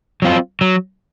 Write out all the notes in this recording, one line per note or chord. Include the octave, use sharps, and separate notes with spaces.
F#3 C4 F4
F#3